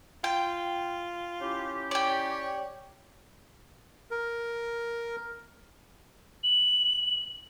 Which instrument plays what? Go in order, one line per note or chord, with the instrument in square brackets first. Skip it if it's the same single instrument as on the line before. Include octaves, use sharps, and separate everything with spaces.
[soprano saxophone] F4 [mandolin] G5
[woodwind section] C#4 E4 G4
[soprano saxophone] C#5 [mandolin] D5 G5
[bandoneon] A#4
[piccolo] F#7